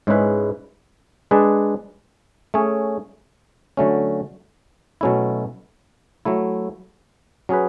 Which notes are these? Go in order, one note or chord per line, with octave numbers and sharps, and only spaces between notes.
G#2 G#3 C#4 E4 B4
G#3 D4 G#4 B4 D5
A3 C#4 G#4 C#5
D3 F#3 A3 C#4
B2 F#3 A3 C#4 E4
F#3 A3 E4
F#3 C#4 G#4 B4